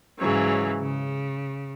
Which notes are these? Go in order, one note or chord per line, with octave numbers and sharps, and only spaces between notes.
G#2 C#3 E3 F#3
C#3